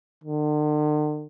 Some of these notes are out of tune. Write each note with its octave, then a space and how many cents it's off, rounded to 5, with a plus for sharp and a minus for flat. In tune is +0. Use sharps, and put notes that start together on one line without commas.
D3 +45